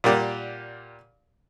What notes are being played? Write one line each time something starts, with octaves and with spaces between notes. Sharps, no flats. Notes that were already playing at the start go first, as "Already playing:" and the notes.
A#2 G3 A#3 G4 D5 F#5